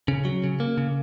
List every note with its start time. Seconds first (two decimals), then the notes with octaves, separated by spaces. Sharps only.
0.08 C#3
0.25 F#3
0.44 C#3
0.60 A#3
0.78 C#3